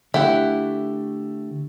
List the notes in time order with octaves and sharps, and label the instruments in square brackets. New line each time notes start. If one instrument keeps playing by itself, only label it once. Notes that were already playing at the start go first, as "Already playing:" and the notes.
[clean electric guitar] D3 A3 [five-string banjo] E4 G4 F#5